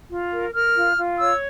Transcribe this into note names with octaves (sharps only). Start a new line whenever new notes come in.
F4
A#4
A#4 F6
F4
F4
C#5 E6